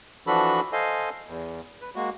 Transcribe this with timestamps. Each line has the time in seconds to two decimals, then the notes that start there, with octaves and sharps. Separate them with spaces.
0.27 E3 F3 D4 F#4 A4 B5
0.73 A4 C5 D#5 F5 G#5
1.27 E2
1.81 B4
1.95 G#3 A#3 F#4